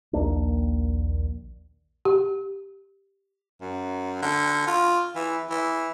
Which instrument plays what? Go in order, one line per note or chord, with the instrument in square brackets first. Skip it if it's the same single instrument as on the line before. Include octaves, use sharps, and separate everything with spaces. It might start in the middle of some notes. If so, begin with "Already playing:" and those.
[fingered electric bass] A#1 D#2 A#3 D4
[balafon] G4
[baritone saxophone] F#2
D3
F4
E3
E3